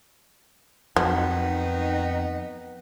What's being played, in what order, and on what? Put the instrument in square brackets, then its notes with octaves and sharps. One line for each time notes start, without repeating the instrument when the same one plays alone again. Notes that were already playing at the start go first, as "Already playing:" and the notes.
[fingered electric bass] F2 [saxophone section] D#3 B3 D#4 [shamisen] F#3